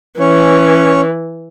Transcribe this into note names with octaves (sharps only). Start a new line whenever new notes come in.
E3 C#4 C#5